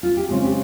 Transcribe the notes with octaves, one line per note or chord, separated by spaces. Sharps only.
F4
G4
C#3 G#3 C4 D#4 G#4
G4